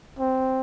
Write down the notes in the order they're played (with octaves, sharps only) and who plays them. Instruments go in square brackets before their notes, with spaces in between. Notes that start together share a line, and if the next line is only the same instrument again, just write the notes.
[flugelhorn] C4